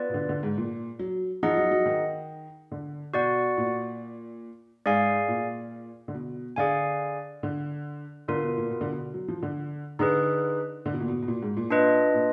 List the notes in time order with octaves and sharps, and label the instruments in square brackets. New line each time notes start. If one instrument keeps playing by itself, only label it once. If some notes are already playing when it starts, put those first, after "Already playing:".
Already playing: [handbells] B3 F4 B4 D5
[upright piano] B2
D3
D3
G#2
A#2
F#3
[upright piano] F3 [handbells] D#4 G#4 D#5 F#5
[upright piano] F#3
F#3
D#3
D3
[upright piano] B2 [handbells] F#4 D5 F#5
[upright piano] A#2
[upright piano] G#2 [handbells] G#4 D5 F5 G#5
[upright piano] A#2
D3
B2
[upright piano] D3 [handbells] G#4 D5 F5 G#5
[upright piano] D3
[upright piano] D3 [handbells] B3 F4 A#4
[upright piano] B2
A#2
B2
D3
B2
F#3
F3
D3
[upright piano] D3 [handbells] D#4 G#4 B4
[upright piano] D3
B2
A#2
B2
B2
A#2
G#2
A#2
[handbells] D4 F4 B4 D#5
[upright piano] A#2